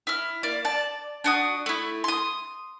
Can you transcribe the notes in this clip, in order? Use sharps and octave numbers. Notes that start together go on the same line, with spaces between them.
E4 F6
A#3 D5 F6
D5 A5
D4 F#4 D#6
A3 E4
C6 D#6